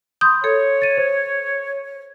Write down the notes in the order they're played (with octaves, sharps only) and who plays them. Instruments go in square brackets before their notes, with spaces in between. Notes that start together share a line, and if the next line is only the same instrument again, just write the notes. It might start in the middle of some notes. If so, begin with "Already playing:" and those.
[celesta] B5 C6 G6 [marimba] D#6
[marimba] A4 [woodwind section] C#5
[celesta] A6 D#7
C5